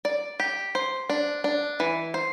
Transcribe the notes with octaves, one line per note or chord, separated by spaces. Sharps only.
D5
G4
C5
D4
D4
E3
C5